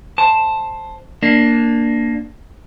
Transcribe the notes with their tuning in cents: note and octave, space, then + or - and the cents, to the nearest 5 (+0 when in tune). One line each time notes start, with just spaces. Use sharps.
C5 +10 A5 +0
A#3 +0 D4 +0